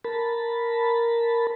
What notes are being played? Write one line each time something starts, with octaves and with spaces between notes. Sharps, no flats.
A#4 A5 B5